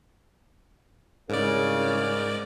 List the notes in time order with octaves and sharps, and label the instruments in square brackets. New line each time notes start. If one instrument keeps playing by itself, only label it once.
[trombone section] C2 C#3 [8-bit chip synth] G#2 D5 [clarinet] A#4